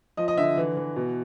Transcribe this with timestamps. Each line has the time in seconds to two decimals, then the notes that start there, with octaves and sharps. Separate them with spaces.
0.17 F3 D#5
0.28 D#5
0.38 D3 E5
0.57 E3
0.77 E3
0.96 B2